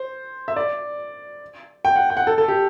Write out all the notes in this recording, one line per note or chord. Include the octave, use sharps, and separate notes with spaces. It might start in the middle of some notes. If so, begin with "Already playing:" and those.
Already playing: C5
E5
D5
G5
F#5
G5
F#5
A4
A4
G4